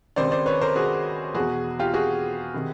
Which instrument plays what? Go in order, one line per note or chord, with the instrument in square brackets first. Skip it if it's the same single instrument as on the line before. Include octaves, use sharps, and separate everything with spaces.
[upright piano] C#2 C3 D#3 C5 D5
C5 D5
B4 C#5
A#4 C5
F#4 G#4
E2 B2 F#4 G#4
F4 G4
F#4 G#4
C3 D#3